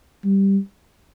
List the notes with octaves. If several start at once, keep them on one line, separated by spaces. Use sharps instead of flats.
G3